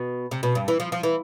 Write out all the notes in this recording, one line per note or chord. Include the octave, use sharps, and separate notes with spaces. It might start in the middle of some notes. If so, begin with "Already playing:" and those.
Already playing: B2
C3
B2
G2
E3
F3
F3
E3